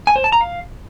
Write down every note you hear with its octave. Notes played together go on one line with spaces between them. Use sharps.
G#5
C5
A5
A#5
F5